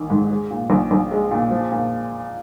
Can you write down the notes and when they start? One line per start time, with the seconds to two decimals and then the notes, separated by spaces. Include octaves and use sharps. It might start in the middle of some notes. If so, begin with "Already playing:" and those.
Already playing: A#1 D#3
0.10 G#2
0.30 G#3
0.51 A#2
0.70 A#1
0.91 A#1
1.11 G#3
1.31 A#2
1.50 F3
1.72 A#2